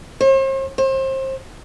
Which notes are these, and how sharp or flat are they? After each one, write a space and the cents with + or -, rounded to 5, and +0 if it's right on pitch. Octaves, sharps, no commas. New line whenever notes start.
C5 +45
C5 +30